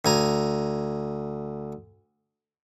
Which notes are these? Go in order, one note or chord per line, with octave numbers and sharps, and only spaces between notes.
D2 G#5 A#5